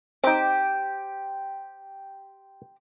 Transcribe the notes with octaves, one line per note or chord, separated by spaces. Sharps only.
C4 D#4 G4 C5 G5